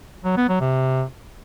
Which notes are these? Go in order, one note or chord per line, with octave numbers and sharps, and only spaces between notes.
F#3
B3
F#3
C3